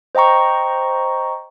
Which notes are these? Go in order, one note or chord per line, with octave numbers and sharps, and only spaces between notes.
C5 D#5 G5 A#5 C#6